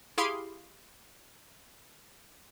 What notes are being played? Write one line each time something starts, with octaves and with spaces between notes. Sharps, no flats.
E4 G4 G#4 F5 C6